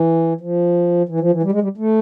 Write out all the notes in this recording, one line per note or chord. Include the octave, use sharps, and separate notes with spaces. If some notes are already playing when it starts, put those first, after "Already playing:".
Already playing: E3
F3
E3
F3
E3
G3
G#3
G3
A3